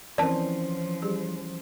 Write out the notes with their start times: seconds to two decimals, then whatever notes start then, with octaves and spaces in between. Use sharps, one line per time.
0.18 E3 F3 C4 C#4 A#4 C5 D5 A5
1.02 G3 G4 G#4